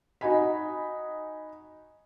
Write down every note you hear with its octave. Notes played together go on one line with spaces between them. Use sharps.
D#4 F#4 D#5 G#5 B5